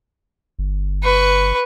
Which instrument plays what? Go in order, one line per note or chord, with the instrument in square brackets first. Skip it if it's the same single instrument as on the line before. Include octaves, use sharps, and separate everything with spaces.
[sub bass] G1
[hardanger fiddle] B4 C#6